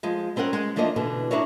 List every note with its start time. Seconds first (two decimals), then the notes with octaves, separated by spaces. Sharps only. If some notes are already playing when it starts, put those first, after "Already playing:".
0.03 F3 G#3
0.36 G3 C4 C#4 A#4 F#5
0.53 G#3
0.76 E3 F3 A#3 D4 D#5
0.96 B2 D3 E3
1.31 D4 E4 F#4 A#4 C#5